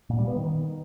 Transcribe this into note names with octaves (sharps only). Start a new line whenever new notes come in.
A#2
G3
B3
D#3